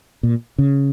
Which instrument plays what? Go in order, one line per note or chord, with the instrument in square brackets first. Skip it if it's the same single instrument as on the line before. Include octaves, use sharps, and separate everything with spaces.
[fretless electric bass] A#2
C#3